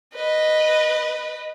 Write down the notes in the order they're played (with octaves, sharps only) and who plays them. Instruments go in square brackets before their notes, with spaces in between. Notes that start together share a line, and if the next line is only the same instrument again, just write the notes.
[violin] B4 D#5